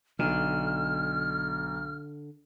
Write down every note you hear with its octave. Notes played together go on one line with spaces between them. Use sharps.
B1 D3 F6